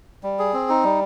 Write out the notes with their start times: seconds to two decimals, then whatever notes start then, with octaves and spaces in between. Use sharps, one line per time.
0.23 G3
0.39 G#4
0.54 C4
0.69 D#4
0.84 G3